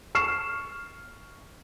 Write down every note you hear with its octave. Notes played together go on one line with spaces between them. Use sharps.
C#6 F6 C7 E7